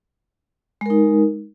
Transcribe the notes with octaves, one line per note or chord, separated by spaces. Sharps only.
G#3 D#4 A#4